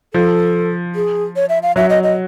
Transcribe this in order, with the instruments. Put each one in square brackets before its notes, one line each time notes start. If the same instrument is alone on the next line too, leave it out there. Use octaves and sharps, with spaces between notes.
[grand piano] F3 [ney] A4
[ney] G#4
C#5
E5
F5
[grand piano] F#3 [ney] E5
[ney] D#5
D#5